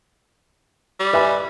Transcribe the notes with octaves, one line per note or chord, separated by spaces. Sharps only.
G3
B4 E5 G#5